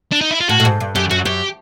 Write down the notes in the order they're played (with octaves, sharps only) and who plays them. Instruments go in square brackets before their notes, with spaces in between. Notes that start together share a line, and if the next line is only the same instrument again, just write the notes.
[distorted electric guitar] D4
D#4
E4
F4
[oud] A2 [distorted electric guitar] F#4
[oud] A2
G#2
G2
[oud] F#2 [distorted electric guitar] G4
[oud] F#2 [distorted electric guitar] F#4
[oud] F#2 [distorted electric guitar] G4